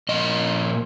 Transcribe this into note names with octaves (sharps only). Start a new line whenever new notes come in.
A#2 F3 A#3 D#5